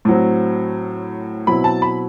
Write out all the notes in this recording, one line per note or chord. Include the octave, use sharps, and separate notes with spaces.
A2 F#3 C4
B2 F#3 C4 E4 B5
A5
B5